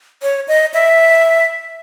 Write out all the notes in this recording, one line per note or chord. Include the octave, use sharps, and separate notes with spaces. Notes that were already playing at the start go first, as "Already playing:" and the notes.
C#5
D#5
E5